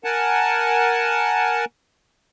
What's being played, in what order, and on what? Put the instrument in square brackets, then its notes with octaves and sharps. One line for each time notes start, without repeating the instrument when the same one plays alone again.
[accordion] A#4 F#5 G#5 A5